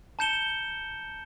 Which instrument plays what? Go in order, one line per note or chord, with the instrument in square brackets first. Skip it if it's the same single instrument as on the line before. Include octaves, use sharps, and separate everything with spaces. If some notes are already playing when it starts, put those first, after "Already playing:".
[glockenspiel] A5 A#5 G6 C#7 E7 G7